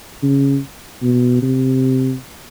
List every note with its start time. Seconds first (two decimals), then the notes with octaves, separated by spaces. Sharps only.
0.23 C#3
1.02 B2
1.42 C3